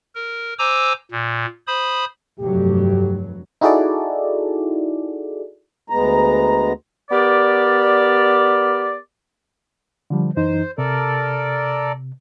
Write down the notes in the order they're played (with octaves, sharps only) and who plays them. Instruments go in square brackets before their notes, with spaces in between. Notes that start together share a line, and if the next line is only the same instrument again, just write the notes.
[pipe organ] A#4
C5 G#5 A#5 D6 E6
A#2
C5 B5 D#6
[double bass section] F1 G2 F#3 [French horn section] A3 G4
[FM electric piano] D#4 E4 F#4 G#4 A4 D5
[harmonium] D2 G#3 B3 A#5
[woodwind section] B3 G4 A#4 D5
[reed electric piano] D3 F3 G3
[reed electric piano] F#2 E3 D#4 [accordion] C5
[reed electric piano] C3 [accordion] A4 A#4 D5